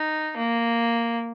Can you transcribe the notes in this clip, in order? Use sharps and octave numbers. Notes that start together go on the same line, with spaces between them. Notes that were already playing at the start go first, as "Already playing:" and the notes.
Already playing: D#4
A#3